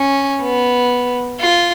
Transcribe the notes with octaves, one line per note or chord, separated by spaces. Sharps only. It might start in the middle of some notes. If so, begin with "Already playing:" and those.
Already playing: C#4
B3
F4